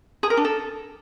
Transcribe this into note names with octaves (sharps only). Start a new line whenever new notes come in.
G#4
A#4
D4
A4